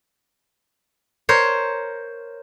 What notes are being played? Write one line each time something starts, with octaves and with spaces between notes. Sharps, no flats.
A#4 C5 C#5